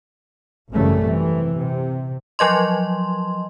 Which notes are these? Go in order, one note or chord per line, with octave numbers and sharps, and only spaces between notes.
G#1 F#2 C#3 E3 G3 A3
C3 E3
C3
F3 F#3 D#5 C6